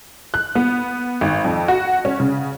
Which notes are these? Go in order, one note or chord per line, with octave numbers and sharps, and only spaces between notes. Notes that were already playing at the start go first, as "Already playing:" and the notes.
F#6
B3
G#1
F2
F#4
C#4
C#3